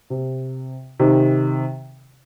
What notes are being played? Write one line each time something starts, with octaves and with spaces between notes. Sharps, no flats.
C3
C3 D#3